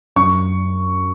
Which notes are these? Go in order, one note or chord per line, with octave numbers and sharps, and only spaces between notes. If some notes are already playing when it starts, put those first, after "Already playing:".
F#2 C#6